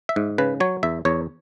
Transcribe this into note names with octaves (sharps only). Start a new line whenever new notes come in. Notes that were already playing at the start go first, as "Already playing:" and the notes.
E5
G#2
C#3 B4
F#3 C#5
E2 E5
E2 C#5